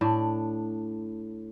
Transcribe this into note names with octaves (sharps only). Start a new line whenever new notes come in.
A2 D4